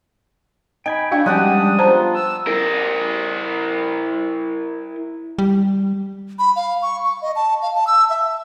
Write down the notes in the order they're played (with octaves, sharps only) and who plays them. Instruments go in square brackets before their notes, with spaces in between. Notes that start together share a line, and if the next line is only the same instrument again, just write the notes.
[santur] D#4 [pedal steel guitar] G5 G#5 B5
[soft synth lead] D4 [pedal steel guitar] E4 [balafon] F#4 F5 G5
[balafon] F3 C#4 [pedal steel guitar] G3 G#3 [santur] D4 F#5 G5 [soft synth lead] D#6
[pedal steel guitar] B3 F4 [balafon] C5 A5 A#5
[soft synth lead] E6
[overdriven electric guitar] E4 A#4
[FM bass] G3
[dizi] B5
F5
C#6
C#6
D#5
A5
F5
A5
E6
E5